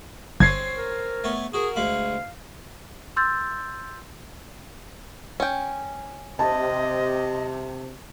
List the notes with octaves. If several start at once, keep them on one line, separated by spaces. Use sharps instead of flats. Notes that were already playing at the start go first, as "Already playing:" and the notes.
G1 C4 C#4 G#6 C7
A#4
A3 B3 C#5
F#4 G#4 A#4
D2 G#3 F5 B5
C6 E6 G6 A6
C#4 G5
C3 D#5 A5